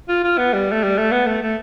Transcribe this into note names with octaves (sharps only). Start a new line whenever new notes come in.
F4
F4
B3
G3
A3
G3
A3
B3
A3
A3